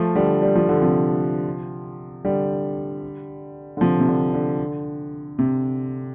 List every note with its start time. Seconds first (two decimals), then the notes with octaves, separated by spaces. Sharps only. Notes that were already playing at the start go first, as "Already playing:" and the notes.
Already playing: F3 A3
0.15 D3 G3
0.42 G3
0.55 F3
0.69 D3
0.82 C3 F3
2.24 D3 G3
3.77 D3
3.81 C3 F3
4.00 C3
4.07 D3
4.33 D3
5.39 C3